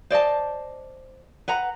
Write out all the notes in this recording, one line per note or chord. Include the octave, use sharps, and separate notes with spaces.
C5 D5 D#5 A5
B4 F#5 A#5